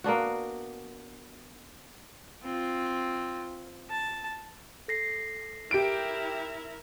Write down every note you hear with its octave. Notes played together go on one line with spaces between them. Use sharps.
A#3 B3 D4 F#4
C4 F4
A5
A4 A#6 C7
E4 G4 A#4 D7